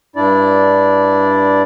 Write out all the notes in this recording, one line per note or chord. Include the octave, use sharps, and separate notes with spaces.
G2 D4 E4 D5